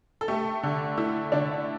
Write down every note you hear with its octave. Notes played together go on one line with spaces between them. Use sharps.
A4
A3 G4
D3
A3 E4
D3 D4